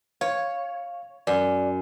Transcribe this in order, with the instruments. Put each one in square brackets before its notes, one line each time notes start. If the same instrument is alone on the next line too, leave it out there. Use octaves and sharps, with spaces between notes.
[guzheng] C#5 [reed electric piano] F5
[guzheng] F#2 [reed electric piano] D5